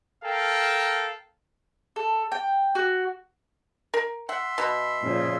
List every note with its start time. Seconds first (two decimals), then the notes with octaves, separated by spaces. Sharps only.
0.23 A4 A#4 F5 G5
1.96 A4
2.32 G5
2.75 F#4
3.94 A#4
4.29 E5 F#5 C6
4.58 B2 B5
5.03 A#2 C#3 F3